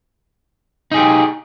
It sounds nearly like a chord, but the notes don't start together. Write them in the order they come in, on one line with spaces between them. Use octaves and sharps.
D#4 G#4 G4